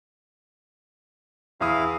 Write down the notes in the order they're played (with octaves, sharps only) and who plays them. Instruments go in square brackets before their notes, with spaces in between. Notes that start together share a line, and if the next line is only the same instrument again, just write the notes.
[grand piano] E2 B5 D#6 [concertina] E4 F5